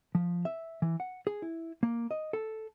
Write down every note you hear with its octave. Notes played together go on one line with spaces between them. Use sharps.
F3
E5
E3
F#5
G#4
E4
A#3
D#5
A4